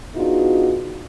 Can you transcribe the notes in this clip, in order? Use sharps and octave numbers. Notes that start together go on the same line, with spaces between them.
B3 D4 D#4 F4 F#4 G#4